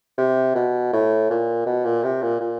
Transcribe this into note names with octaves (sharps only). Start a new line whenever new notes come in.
C3
B2
A2
A#2
B2
A#2
C3
A#2
A#2